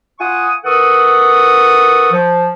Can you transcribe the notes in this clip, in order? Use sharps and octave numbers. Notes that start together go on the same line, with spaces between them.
F4 F#5 G#5 C#6 D#6
E3 A4 A#4 F#5 C#6 D#6
F3